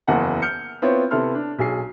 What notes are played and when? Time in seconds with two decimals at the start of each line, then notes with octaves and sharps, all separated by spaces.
0.07 F#1 E2 A#3 E4 F#5 A5
0.42 F6 G6 C#7
0.82 B3 C4 E4 F4 C#5
1.11 C3 B3 E4 A4 C6 F6
1.35 D4
1.59 B1 G#4 C7